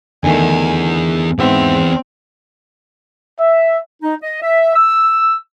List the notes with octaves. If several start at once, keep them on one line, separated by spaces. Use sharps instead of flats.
E2 D3 D#3 A3 G#5
E2 G#2 B3 C4 E5
E5
D#4
D#5
E5
E6